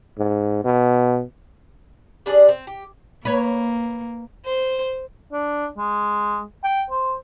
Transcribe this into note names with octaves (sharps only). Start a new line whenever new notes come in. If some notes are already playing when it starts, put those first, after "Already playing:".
G#2
B2
G3 D4 G#4 D5
C4
G4
A#3 B4 C#5
C5
D4
G#3
G5
C5